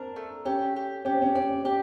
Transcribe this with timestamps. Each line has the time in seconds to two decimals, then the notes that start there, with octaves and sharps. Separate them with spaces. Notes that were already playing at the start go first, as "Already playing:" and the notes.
Already playing: C4 D4 A#4
0.16 A3
0.45 C#4 G4
0.76 G4
1.05 C#4 G4
1.13 C4
1.22 C#4
1.35 C#4 D5
1.64 C#4 G4